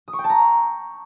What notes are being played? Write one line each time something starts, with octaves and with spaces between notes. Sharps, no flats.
D#6
C#6
G5
A5
A#5